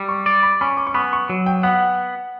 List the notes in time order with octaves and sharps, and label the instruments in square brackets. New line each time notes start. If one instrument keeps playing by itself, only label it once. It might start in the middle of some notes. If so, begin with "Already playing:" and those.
Already playing: [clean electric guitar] G3
[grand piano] C#6
[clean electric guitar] D5
[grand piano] B5
[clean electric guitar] C#4 [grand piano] B5
[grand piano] D6
C#6
[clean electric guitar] B3 [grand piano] B5
[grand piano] C#6
[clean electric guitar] F#3
[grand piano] G5
[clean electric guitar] B3 [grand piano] F#5